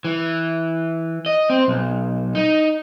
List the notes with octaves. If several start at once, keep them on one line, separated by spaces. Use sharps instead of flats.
E3
D#5
C4
B1
D#4